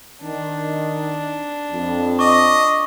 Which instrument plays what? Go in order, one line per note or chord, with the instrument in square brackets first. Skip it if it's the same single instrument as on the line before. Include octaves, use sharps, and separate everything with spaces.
[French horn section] D#3 [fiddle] D4
[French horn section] F2
[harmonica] D#5 [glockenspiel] C#6 D6